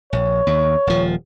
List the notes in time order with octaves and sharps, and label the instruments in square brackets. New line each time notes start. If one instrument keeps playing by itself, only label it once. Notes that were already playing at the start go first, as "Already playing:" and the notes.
[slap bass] A#1 [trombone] C#5
[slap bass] D#2
D#1 F3